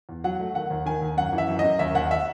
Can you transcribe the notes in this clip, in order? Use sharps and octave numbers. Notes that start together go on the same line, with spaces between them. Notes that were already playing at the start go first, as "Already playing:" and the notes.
E2
F#3 F#5
A3
D#3 F#5
D#2
D#3 G#5
D#2
F#2 F#5
E3
E5
F#2
D#5
F#2
D#2 E5
D#2 F#5
E5